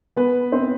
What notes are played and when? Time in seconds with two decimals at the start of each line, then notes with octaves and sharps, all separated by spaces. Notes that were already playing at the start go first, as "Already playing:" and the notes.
0.16 B3 B4
0.52 C4 C5